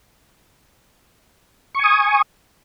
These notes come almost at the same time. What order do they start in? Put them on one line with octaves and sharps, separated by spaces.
C#6 G#5 D#6